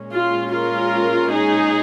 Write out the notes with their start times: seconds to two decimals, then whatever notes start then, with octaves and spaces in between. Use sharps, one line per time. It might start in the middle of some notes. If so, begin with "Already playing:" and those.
Already playing: A#2 G#3 C#4
0.13 F4
0.52 F4 A#4
1.31 D#4 G#4